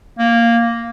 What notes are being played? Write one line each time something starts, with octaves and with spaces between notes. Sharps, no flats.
A#3